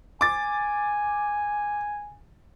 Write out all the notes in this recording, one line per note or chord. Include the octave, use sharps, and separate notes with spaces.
G#5 D6 A6